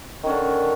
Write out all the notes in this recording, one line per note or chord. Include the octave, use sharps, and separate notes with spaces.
D3 D#3 C#4